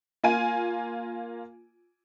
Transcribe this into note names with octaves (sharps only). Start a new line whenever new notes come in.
A#3 F4 G#5 D#7